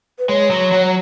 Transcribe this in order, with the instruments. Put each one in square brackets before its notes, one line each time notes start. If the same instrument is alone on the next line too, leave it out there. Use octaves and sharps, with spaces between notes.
[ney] B4
[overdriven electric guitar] G#3 [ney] C#5
[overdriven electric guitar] F#3
F#3